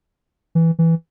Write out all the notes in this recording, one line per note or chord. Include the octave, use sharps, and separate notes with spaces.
E3
E3